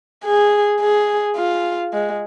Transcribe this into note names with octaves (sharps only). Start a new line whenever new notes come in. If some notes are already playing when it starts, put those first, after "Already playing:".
G#4
G#4
F4
G#3